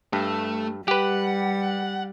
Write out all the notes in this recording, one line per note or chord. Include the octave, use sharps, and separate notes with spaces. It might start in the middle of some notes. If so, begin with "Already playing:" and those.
G2 A3
G3 G4 B4 F#5